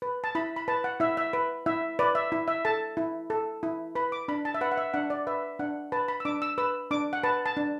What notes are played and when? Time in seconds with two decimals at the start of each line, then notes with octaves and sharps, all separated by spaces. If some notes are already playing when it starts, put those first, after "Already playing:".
0.02 B4
0.24 A5
0.35 E4 B5
0.56 B5
0.68 B4 A5
0.84 F#5
1.00 E4 E5
1.17 E5
1.33 B4
1.66 E4 E5
1.99 B4 D5
2.15 E5
2.32 E4
2.48 E5
2.65 A4 A5
2.97 E4
3.30 A4
3.63 E4
3.95 B4 B5
4.12 D6
4.28 D4 B5
4.45 A5
4.55 E5
4.61 B4 F#5
4.72 F#5
4.77 E5
4.94 D4 F#5
5.10 D5
5.27 B4 E5
5.59 D4 F#5
5.92 B4 A5
6.08 B5
6.20 E6
6.25 D4 D6
6.42 E6
6.58 B4 E6
6.91 D4 D6
7.13 F#5
7.23 B4 A5
7.46 A5
7.57 D4